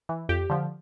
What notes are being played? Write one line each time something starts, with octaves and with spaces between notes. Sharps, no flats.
E3
F2 G4
D3 F3